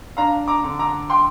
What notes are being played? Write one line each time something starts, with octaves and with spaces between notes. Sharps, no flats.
D4 F5 A#5
A#5 D6
D3
A#5 D6
G5 C6